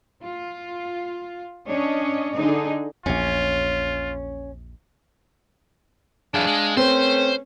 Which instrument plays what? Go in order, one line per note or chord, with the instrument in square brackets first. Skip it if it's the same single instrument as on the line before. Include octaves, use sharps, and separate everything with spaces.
[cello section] F4
C#4 D4 C#5 D#5
D3 D4 D#4 G#4 D#5
[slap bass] A#1 E2 [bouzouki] C#4 [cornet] F4
[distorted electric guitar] F#2 E3 [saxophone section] D4 G#4 F5
[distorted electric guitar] G#3
[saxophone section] A3 C#4 B4 [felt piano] C4 [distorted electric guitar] C5